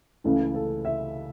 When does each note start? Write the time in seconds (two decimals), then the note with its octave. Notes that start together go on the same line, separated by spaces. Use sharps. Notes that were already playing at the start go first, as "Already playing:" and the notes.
0.24 C#2 C#3 E3 A3 A4
0.55 A4
0.85 E5